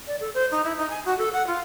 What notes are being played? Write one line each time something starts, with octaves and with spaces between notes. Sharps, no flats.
D5
A4
C5
D#4
E4
D#4
G#5
F#4
A4
F#5
F4